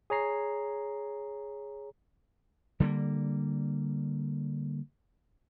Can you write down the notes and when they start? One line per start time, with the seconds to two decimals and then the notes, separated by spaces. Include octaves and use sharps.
0.10 G#4 C#5 A#5 C7
2.80 D3 G3 G#3 A#3